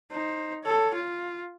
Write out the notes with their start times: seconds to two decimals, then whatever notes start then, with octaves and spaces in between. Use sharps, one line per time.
0.11 D#4 C5
0.64 A4 C#5
0.95 F4